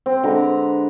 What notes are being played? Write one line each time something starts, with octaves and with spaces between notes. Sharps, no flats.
C4
D3 G#3 B4 A#5